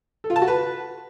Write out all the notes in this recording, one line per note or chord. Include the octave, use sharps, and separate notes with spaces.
A4
F4
A5
F#4
B4